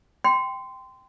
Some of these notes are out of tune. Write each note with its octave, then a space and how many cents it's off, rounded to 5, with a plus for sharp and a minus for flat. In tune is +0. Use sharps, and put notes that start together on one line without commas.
G5 +0 C6 -25